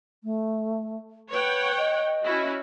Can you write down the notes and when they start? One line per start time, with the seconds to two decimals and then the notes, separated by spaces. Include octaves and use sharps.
0.24 A3
1.32 B4 C#5 F#5 G5
1.78 D#5
2.24 C#4 E4 F#4